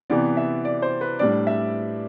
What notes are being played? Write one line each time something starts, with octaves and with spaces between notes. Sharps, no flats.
C3 E3 B3 D5
E5
D5
C5
B4
A2 G3 D4 D5
E5